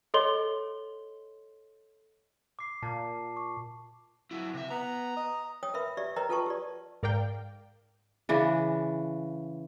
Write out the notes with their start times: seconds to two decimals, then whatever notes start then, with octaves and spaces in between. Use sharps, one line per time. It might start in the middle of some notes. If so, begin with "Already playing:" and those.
0.14 A4 C#5 D#5 C6 G7
2.59 D6 C7
2.83 A#2 A5
3.36 C#6 D6
4.31 F#3 E4
4.54 C3 E5
4.70 B3 A#5
5.17 D#5
5.63 C#5 G5 D#6
5.74 A#4 B4 E5 B5
5.97 G4 D5 E5
6.16 A#4 B4 C#5 D#5 G5 A#5
6.29 F4 A4 B4 G5 A5 C#6
6.46 G4 D5
7.03 G#2 A#4 D5 F5 G5
8.29 C#3 E3 D4